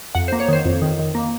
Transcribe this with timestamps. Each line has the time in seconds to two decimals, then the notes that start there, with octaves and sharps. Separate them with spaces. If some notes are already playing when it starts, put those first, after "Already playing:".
0.15 F2 F#5
0.28 A#3 C5
0.40 C#5
0.48 D#3 C5
0.65 F2
0.82 D#3
0.99 D#3
1.15 A#3